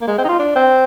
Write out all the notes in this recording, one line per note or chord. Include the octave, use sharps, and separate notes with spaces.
A#3
G#3
C4
D#4
F4
D4
C4